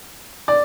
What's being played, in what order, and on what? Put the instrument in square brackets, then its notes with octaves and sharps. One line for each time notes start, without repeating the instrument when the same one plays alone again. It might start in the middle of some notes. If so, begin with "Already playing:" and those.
[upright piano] D5